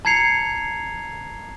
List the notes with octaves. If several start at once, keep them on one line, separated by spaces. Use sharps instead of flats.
A5 A#5 G#6 C7 C#7 F7